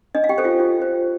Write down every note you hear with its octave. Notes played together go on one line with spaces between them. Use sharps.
D4 D#5
F5
G4 G5
A4 C5
F4 F5
F4
C5